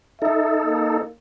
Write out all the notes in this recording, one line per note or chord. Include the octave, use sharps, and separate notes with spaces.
D#4 A4 E5
A#3